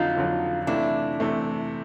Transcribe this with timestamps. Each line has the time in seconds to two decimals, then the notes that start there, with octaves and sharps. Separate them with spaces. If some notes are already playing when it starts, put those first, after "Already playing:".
Already playing: F2 D3 F#3 D#4 F4
0.16 F2 D3 F#3
0.67 C3 E3 A3 D4 E4
1.20 C3 E3 A3